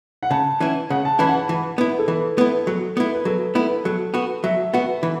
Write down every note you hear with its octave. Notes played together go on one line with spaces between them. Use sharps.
F#5
C#3 A5
E3 C#4 E4
C#3 F#5
A5
E3 C#4 E4 B5
F#5
A5
E3
B3 E4
A4
E3 B4
B3 E4
F#3 A4
B3 E4
B4
F#3 A4
B3 E4
F#3 A4
B3 F#4
F#3 E5
B3 F#4
E3